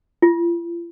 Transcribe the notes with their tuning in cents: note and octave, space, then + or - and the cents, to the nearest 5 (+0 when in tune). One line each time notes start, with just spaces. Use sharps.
F4 -45